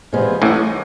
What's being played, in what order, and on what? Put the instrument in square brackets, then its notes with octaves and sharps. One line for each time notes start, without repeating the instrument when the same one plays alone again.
[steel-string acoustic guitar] E2 C3 F3 G#3 B3
[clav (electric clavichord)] A1 A2